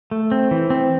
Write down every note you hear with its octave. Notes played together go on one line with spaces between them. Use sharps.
A3
C4
E3
C4